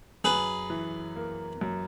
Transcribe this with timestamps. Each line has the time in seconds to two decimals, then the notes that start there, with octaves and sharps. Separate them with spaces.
0.24 F#2 G#4 B4
0.70 E3
1.16 A#3
1.61 F#2